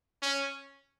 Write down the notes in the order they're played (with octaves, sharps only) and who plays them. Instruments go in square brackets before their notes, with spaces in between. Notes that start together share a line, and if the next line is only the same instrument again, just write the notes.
[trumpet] C#4